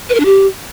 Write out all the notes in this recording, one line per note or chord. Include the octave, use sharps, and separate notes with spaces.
B4
A#4
D4
G4